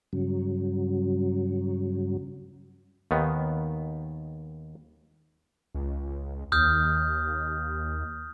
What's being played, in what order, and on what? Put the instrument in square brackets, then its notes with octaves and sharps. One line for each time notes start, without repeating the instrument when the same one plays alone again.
[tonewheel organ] G2 C#3 F#3
[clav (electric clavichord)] D#2 D#3 B3
[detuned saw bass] C#2
[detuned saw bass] D#2 [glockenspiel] D#6 F6 G6